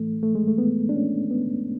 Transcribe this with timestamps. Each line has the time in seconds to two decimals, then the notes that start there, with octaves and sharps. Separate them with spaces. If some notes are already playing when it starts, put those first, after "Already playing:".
Already playing: A2 E3 A3
0.23 A3
0.35 G#3
0.47 A3
0.58 B3
0.89 D4
0.95 C#4
1.31 B3